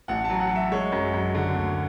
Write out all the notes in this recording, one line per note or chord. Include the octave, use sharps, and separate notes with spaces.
A1 F#5
A5
F#3
F#5
F#3
E5
G#3 C#5
F#2
F#2
D3
D2